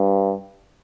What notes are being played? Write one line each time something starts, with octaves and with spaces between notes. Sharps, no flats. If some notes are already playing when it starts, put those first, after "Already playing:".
Already playing: G2